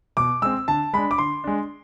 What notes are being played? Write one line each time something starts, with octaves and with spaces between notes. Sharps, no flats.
B2 D6
G#3 C4 E6
D3 A5
G#3 D4 B5
D6
D3 C6
G#3 D4